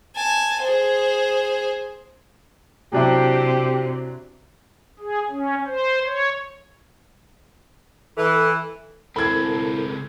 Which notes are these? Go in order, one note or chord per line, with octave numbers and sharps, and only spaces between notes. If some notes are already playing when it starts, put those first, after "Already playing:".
G#5 A5
G#4 C5
C3 F#3 D4 E4 G4
G#4
C#4
C5
C#5
E3 A4
C#2 C4 E4 A4 A#4 B5 G#6